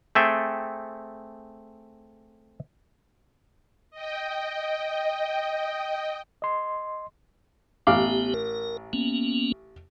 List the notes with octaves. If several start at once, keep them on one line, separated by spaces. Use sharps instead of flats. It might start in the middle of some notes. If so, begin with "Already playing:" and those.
A3 C4 G#4 A4 E5 G5
D#5 G5
D#5 C6
A1 B3 G4 F5 D6
A#4
A#3 B3 C#4